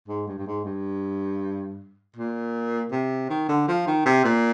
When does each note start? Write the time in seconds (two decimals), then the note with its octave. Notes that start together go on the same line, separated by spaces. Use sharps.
0.08 G#2
0.27 G2
0.38 G2
0.47 G#2
0.65 G2
2.16 A#2
2.92 C3
3.30 D#3
3.49 D3
3.68 F3
3.87 D#3
4.06 C3
4.24 A#2